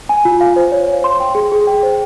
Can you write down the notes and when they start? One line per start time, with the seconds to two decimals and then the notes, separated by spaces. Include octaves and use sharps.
0.09 G#5
0.25 F4
0.41 F5
0.56 C5
0.72 C#5
0.88 C#5
1.04 C6
1.20 G5
1.35 G#4
1.52 G#4
1.67 G5
1.83 C5